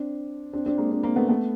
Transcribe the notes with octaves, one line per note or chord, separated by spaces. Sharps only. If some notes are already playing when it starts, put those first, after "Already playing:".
Already playing: C4 D4
C4 D4
C4 D4
G#3 A#3
C4 D4
A#3 C4
A3 B3
A3 B3